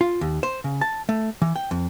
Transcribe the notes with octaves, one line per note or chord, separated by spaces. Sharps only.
F4
D#2
C5
C#3
A5
A3
E3
G5
F2